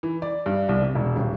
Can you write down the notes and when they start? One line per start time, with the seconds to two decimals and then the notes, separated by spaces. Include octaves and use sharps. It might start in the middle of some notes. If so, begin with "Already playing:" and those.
0.03 E3
0.22 D5
0.46 G2
0.69 C2
0.82 C3
0.95 E1
1.16 D#1